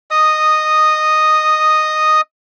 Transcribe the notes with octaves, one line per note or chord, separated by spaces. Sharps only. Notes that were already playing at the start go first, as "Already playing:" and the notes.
D#5 D#6